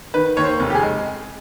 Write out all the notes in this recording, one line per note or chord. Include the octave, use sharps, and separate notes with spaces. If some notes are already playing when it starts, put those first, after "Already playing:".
D#3 B4
D#2 C#5
C5
F1
G4
G#4
G#3